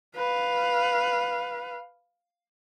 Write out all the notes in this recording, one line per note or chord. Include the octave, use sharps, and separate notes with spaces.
B4 F5